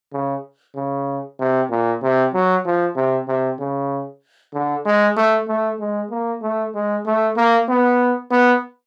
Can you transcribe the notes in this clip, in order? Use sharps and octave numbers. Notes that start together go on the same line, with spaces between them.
C#3
C#3
C3
A#2
C3
F#3
F3
C3
C3
C#3
D3
G#3
A3
A3
G#3
A#3
A3
G#3
A3
A#3
B3
B3